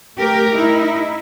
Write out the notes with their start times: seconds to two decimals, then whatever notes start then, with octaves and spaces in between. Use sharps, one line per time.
0.17 A3 G4 A#4
0.54 D#4 E4